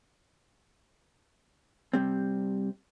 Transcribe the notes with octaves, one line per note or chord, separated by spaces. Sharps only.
C3 G3 C4